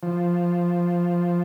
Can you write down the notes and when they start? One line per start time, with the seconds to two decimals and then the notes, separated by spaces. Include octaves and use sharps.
0.03 F3